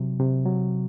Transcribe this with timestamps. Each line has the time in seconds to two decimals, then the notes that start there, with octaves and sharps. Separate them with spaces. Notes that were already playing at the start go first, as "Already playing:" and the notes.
Already playing: C3 F#3
0.20 C3
0.46 F#3